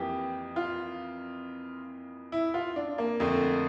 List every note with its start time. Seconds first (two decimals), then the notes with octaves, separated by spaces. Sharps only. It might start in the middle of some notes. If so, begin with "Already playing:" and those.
Already playing: F2 E3 A#3 E4 G4
0.56 F4
2.32 E4
2.54 F4
2.76 D4
2.98 A#3
3.20 F2 D3 A3